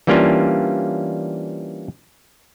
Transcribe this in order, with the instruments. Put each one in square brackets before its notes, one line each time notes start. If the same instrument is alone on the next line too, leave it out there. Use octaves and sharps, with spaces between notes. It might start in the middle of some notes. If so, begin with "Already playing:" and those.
[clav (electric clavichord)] E3 G3 A#3 C#4 D4 F4